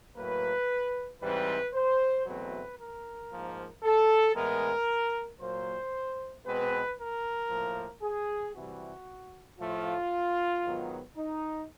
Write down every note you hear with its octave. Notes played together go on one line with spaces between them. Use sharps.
A2 F#3 A#3 B4
G#2 E3 G3 C4 B4
C5
E2 B2 F#3 A3 C4 B4
A#4
G#2 F3 A#3
A4
A2 E3 G#3 B3 A#4
A#2 F#3 A#3 C5
B2 G#3 C4 B4
A#4
A2 F3 A#3
G#4
C3 E3 G3 F#4
A2 F3 A3 F4
G#2 D#3 F#3 B3
D#4